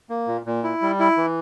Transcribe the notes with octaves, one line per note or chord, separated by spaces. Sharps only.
A#3
A#2
A#2
E4
G3
E4
E3